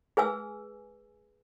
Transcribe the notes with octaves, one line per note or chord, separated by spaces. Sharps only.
G#4 B4 G#5 E6